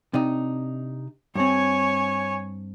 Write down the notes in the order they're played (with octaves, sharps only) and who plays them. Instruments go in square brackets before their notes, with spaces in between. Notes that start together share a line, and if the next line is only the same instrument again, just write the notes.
[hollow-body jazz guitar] C3 D4 D#4
[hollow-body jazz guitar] G2 C4 [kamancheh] C#5 G#5